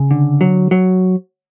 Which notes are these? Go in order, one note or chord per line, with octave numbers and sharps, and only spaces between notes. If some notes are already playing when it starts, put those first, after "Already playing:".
Already playing: C#3
D3
F#3
F#3